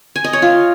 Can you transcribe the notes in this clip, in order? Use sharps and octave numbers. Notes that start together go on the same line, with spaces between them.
G#5
D#5
C#5
F4